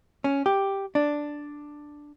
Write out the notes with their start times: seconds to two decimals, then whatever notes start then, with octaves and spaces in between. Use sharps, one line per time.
0.24 C#4
0.46 G4
0.95 D4